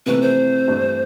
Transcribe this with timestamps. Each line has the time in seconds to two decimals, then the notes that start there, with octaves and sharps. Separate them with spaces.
0.06 F2 C3 E3 A3 B4
0.22 C5
0.67 G2 E3 A3 D4